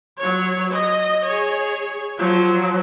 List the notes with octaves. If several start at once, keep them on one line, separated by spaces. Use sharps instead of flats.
F#3 C#5
D#5
G#4 C#5
F3 F#3